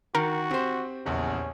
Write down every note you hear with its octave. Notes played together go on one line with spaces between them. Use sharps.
D#3 F#4 A#4
C4 G4 C5
A#1 E2 C#3 C#4